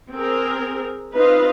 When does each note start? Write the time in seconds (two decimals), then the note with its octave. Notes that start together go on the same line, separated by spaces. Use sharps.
0.12 C4 G#4 A#4
1.14 C4 D#4 F4 B4 D#5 F5